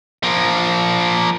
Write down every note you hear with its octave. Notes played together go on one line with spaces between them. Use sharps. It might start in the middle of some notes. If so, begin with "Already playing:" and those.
F3 A#3